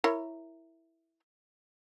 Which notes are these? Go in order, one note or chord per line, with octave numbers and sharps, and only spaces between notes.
E4 A#4 C#5